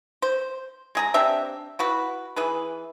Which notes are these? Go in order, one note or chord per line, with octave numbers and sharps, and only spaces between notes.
C5
G#3 G#4 A#5
C4 D4 G4 E5
E4 F#4 B4
E3 G#4 B4